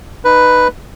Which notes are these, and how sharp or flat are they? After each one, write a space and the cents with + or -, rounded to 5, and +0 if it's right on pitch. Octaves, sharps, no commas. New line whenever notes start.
D#4 -15 B4 +0